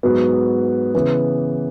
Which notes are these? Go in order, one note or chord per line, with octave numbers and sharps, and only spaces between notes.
G#2 F#3 B3
C#3 E3 B3